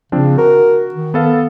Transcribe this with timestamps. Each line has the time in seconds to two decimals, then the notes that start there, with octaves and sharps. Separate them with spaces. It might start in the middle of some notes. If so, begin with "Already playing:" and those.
0.12 C#3 F3 C4 D4
0.38 F#4 A#4
0.94 D#3
1.14 B3 A4 F5